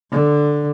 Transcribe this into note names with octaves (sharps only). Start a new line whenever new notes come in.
D3